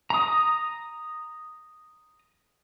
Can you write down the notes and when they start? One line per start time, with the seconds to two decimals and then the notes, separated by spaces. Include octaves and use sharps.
0.10 A#5 D#6